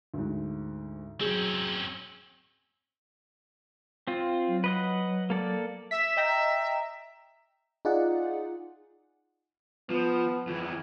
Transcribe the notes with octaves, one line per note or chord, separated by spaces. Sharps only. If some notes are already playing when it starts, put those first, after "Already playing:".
D2 G#2
F#3 C4 C#4 G#4
C4 F4
F#3
B4 D#5 F#5
A#3 A4 D5
E5 B6
D#5 G5 A#5
D#4 F4 G#4 D5 F#5
F3 B3
F2 E3